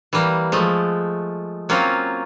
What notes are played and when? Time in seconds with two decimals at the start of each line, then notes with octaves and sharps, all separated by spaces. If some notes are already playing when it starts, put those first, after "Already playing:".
0.13 E3 G3 A#3
0.52 F3 G#3 A3
1.69 F#3 A#3 C4 C#4 F4